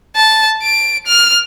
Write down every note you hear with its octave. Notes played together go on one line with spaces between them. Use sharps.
A5
D7
F6